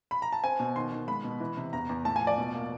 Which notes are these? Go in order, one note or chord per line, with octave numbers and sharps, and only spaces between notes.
B5
A#5
A5
C4 G#5
B2
D#3 C6
D#3
G#3 B5
B2
E3
C3
E2 A#5
E2
A2 A5
G#5
F3
D5
B2
A#3